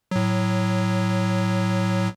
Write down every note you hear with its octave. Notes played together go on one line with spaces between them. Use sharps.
A2 F#3